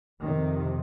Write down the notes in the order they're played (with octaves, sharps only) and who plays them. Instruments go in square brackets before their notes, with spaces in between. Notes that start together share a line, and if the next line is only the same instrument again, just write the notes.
[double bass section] F2 C3 D#3